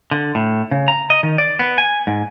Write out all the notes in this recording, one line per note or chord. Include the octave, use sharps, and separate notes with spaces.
D3
A2
C#3
A#5
D#5
D#3
D5
B3
G#5
G#2